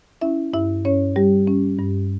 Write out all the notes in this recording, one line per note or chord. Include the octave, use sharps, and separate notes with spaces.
C#4 E4 E5
G2 E4 E5
G2 C#4 C#5
G3 G4
C#4
G2